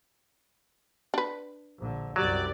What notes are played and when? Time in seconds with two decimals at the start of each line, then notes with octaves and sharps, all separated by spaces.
1.14 D4 B4
1.79 A#1 D3
2.16 C2 F#2 F#3 G4 D5